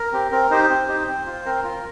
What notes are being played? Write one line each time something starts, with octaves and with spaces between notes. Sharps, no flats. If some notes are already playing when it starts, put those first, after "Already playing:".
Already playing: A#4
C4 G4
C4 A#4
D#4 G4 C5
C4
D#4 G4
C4
F4
C4 A#4
F4